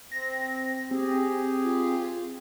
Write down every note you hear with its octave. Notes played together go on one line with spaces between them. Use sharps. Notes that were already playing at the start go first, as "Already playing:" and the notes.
C4 A#6
C4 G4 G#4
F4